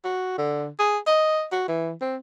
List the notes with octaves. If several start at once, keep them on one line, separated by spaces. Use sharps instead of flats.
F#4
D3
G#4
D#5
F#4
E3
C4